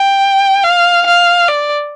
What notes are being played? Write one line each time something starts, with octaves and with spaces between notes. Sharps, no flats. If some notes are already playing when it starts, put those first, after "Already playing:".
Already playing: G5
F5
F5
D5